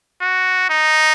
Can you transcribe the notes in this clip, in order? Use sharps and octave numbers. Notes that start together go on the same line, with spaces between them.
F#4
D#4